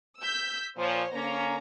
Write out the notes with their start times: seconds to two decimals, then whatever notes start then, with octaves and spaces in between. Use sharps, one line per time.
0.20 E6 G6 B6
0.77 A#2 F3 C5 C#5
1.13 D3 A#3 C#4 A#5